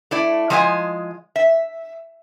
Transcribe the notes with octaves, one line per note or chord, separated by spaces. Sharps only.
A3 E4 D5
F3 G#3 D#5 E5 G#5
E5